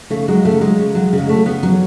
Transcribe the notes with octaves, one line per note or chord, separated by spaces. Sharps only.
C#3 A3
F#3 G#3
C#3 A3
F#3 G#3
C#3
F#3
C#3
G#3
F#3 A3
C#3 B3
F#3 C#4